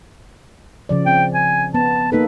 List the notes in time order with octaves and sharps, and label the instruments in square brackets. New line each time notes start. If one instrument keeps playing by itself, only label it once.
[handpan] C#3 F3 D5
[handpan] C4 [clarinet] G5
[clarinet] G#5
[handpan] B3 [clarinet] A5
[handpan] A#3 D#4 A4 [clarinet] B4